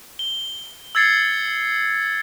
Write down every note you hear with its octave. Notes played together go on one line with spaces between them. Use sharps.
G7
E6 G#6 A6 C7 C#7